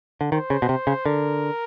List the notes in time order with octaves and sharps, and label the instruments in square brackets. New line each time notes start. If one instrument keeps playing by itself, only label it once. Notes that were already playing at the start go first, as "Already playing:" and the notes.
[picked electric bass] D3
[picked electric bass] D#3 [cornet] C5
[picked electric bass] C#3
B2
C3
C#3
[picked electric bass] D3 [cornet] A#4